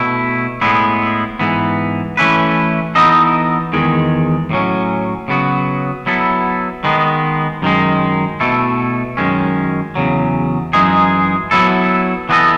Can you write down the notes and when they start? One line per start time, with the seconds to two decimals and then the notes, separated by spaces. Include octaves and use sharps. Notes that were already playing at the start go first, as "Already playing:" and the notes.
Already playing: B2 A3 E4
0.61 A2 G#3 B3 E4
1.39 G#2 E3 B3
2.17 E3 A3 C#4 E4 B4
2.95 E3 B3 D#4 A4 D#5
3.73 E2 D#3 G#3
4.51 A2 F#3 C#4
5.28 C#3 F#3 B3 F#4
6.06 F#3 B3 E4 A4
6.84 D#3 G#3 B3
7.62 F#2 D#3 G#3
8.40 B2 A3 E4 A4
9.17 F#2 D#3 G#3 C#4
9.95 E2 C#3 F#3
10.73 F#2 E3 G#3 D#4 G#4
11.51 F#3 B3 E4 A4
12.29 E3 B3 F#4 A4 D#5